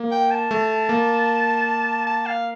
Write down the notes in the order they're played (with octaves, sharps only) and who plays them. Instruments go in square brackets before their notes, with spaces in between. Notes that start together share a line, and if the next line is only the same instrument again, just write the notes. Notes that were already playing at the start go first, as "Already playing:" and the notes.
Already playing: [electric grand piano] A#3
[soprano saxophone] G5
A5
[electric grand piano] A3
A#3
[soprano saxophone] A5
F5